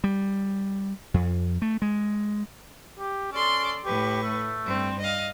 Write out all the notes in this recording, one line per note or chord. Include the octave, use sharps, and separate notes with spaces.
G3
F2
A3
G#3
G4
C#4 A4 D5 C6
A2 G4 B4 C#6
A3
G2 C4
D#5 F5